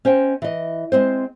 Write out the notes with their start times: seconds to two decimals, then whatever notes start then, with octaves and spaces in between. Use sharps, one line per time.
0.05 C#4 C5 D#5 G5
0.42 E3 D#5
0.92 G#3 C4 C5